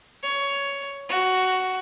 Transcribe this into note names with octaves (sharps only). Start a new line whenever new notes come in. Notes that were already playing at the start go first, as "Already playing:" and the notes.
C#5
F#4